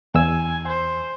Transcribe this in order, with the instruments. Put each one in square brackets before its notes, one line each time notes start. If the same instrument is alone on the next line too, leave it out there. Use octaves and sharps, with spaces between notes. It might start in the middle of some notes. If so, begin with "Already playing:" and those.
[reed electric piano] E2 E6 [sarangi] G#5
[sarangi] C5